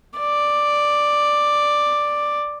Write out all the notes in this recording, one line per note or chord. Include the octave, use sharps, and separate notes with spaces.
D5